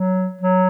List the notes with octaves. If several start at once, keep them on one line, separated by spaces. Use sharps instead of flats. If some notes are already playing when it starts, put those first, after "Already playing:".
Already playing: F#3
F#3